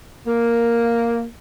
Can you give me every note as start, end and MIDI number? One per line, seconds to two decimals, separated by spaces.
0.26 1.26 58